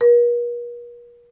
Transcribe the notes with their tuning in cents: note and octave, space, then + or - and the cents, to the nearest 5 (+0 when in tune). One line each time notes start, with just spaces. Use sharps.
A#4 +45